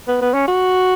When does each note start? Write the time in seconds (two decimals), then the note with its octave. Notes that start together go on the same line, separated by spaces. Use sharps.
0.08 B3
0.21 B3
0.34 C#4
0.48 F#4